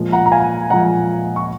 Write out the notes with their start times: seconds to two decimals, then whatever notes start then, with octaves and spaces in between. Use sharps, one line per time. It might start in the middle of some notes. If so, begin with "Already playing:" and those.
Already playing: A#2 F3 G#3
0.12 F#5 A#5
0.26 A#5
0.32 F5 G#5
0.70 A#2 F3 G#3 F#5 A#5
1.36 C#6